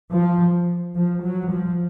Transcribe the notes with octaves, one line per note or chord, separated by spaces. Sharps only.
F3
F3
F#3
F3